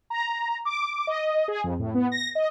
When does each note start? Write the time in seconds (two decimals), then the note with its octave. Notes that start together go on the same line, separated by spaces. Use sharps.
0.10 A#5
0.65 D6
1.07 D#5
1.48 G#4
1.64 F2
1.79 A2
1.95 B3
2.12 A#6
2.35 D#5